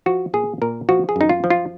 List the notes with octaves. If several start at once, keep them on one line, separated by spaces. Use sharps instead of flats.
F3 F#4
A#2 G#4
A#2 A#4
F3 F#4
G#4
F#2 D#4
F4
F3
F4